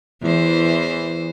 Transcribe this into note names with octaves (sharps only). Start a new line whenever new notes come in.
E2 E3 C5